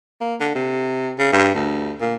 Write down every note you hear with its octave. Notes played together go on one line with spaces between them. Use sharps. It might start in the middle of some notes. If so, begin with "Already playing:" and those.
A#3
D3
C3
C#3
G2
D2
A#2